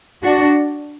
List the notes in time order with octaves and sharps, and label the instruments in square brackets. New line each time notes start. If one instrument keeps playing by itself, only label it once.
[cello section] D4 F#4